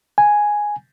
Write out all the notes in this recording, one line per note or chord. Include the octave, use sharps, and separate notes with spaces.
G#5